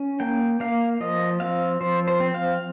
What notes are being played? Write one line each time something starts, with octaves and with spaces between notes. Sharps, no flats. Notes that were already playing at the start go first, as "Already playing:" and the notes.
Already playing: C#4
A#3 G5
A#3 F5
F3 D#5
C4 F5
F3 C5
C5
C4
F5